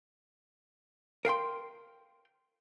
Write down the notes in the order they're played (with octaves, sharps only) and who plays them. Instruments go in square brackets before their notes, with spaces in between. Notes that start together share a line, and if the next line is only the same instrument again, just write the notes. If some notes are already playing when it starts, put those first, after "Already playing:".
[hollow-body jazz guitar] A#4 F5 G5 C6